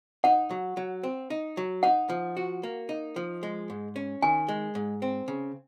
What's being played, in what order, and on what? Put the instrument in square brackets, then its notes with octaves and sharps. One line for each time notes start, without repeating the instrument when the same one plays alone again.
[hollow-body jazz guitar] D#4 [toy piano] F#5
[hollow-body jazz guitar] F#3
F#3
C4
D#4
F#3
[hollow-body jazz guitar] D#4 [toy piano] F#5
[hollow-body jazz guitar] F3
F#4
A#3
D#4
F3
G#3
G#2
C#4
[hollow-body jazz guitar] D#3 [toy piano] G#5
[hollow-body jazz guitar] G#3
G#2
C4
C#3